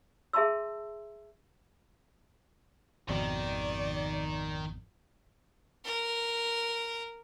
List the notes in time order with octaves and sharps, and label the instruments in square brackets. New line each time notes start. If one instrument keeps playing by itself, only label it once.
[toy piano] G#4 E5 A5 A#5 C6 E6
[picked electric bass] G#1 F2 B2 [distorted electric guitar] D#3 [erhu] D5
[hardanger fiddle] A#4